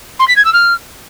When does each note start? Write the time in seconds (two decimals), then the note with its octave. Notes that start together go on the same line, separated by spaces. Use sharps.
0.19 C6
0.28 B6
0.36 G#6
0.45 E6
0.53 F6